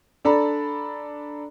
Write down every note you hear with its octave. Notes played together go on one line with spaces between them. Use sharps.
D4 A4 D5 A#5 B5